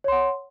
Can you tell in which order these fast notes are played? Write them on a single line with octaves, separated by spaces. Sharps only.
C#5 C6 F#5